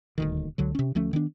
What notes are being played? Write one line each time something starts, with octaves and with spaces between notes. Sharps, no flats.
D#1 D2 D#3
C#2 D3 F#3
C3 C#4
D2 F3 A3 C#4
D#3 B3 D4